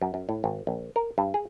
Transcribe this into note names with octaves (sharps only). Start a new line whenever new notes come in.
F#2
F#2
A2
G#1
A#1
A#4
G2
G#4